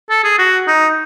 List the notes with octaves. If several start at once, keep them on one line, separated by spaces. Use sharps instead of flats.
A4
G#4
F#4
D#4